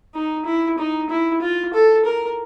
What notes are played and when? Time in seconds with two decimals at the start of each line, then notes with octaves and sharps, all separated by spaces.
0.15 D#4
0.46 E4
0.78 D#4
1.10 E4
1.42 F4
1.74 A4
2.05 A#4